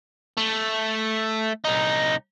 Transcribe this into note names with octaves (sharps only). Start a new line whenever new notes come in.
A3
C2 D#4